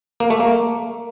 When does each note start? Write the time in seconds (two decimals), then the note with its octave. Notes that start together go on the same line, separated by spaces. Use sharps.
0.20 A#3
0.30 A3
0.40 A#3